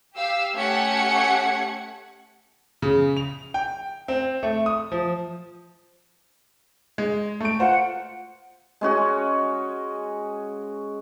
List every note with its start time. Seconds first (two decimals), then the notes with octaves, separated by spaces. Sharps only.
0.14 G4 F5 E6
0.54 A3 C#4 G4 F#5 G#6 C#7
2.82 C#3
3.17 F7
3.54 G5
4.08 C4
4.43 A3
4.66 D#6
4.92 F3
6.98 G#3
7.40 A3 D7
7.60 F4 C5 F#5
8.81 G#3 C#4 F#4 G#4